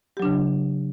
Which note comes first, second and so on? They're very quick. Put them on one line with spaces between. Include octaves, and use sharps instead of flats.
G4 F#3 D4 C#3